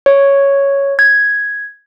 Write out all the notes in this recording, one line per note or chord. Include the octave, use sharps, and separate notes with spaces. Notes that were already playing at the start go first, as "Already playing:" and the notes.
C#5
G#6